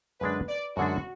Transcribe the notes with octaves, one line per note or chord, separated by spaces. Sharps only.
F#2 D3 G#3 D4 B4
D5
F#2 D3 G#3 D4 F#4